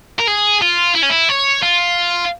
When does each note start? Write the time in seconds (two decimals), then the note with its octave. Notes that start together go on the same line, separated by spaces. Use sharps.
0.19 A#4
0.28 G#4
0.62 F4
0.95 E4
1.02 C#4
1.09 E4
1.29 C#5
1.63 F4